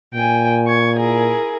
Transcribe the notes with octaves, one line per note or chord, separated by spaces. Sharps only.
A#2 G5 G#5
C#6 G#6
E4 G#4 A#4